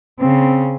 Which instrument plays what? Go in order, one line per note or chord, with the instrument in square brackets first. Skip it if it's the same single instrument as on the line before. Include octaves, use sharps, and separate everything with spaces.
[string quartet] C#3 [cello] C4